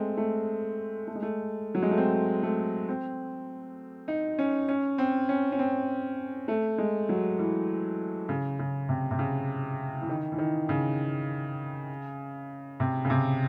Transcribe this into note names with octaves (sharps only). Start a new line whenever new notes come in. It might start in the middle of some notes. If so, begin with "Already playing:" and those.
Already playing: G#3 A3 C4
A3
A3
G#3
A3
F#3
G#3
A3
C4
A3
C4
D#4
C#4
C#4
C4
C#4
C#4
C4
A3
G#3
F#3
E3
C#3
C#3
C3
C3
C#3
E3
D#3
E3
D#3
C#3
C3
C#3
C3